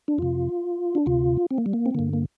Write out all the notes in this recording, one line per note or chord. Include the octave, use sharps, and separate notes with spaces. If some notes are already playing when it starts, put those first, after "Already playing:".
D4
F2 C3 F4
D4
D2 C3 F4
C4
A#3
G3
A#3
C4
G2 D3 A#3
A#3